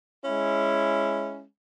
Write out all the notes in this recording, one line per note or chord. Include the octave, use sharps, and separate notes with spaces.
G#3 C#4 E4